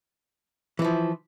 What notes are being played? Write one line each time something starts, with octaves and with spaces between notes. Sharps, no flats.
E3 F3 E4